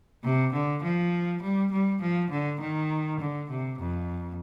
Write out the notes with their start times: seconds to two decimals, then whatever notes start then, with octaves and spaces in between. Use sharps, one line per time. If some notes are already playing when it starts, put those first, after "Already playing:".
0.24 C3
0.53 D3
0.83 F3
1.42 G3
1.72 G3
2.01 F3
2.31 D3
2.61 D#3
3.20 D3
3.50 C3
3.80 F2